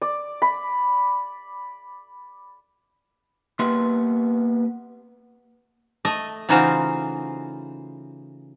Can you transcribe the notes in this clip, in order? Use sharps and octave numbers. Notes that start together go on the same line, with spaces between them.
D5
B5
A#3 B3 G4 B4 E5 C6
A3 D#5
C#3 E3 D#4 F4 F#4 C5